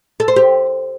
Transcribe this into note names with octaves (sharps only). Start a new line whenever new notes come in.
A4
C5
G4